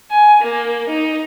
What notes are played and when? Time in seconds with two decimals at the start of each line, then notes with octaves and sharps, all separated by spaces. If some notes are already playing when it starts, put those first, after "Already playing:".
0.11 G#5
0.42 A#3
0.90 D#4